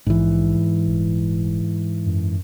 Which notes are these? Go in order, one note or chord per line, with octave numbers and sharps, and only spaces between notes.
A#1 G#2 E3
D#1
F#2